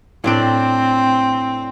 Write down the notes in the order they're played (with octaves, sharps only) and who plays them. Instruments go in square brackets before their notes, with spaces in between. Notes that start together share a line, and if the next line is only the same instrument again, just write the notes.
[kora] A2 D4 D5 [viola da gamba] C4